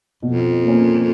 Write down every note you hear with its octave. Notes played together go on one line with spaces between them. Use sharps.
F2 B2
A#3 C#4